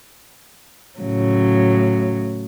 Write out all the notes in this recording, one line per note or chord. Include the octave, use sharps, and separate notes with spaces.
A2 C#3 F#3